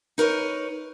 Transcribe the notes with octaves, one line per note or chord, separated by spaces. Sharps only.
D#4 A#4 B4 C#5